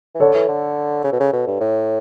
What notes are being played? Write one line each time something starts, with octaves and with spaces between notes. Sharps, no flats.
E3
D3 A4 C#5
E3
D3
C#3
B2
C#3
B2
G2
A2